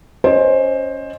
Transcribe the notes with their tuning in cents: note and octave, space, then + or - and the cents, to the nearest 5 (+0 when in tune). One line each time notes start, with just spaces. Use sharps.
C#4 +0 C5 +15 D#5 +0